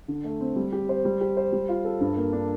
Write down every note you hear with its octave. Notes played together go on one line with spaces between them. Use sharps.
D3
A3
C4
G3
G4
C5
G3
G4
C5
G3
F4
A4
G2
A#3
D4